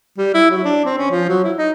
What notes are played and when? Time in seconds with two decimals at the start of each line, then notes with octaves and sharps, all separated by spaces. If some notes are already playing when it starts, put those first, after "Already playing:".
0.18 G3
0.34 E4
0.51 F#3
0.64 D4
0.85 C4
0.98 C#4
1.11 F3
1.29 F#3
1.44 E4
1.57 D#4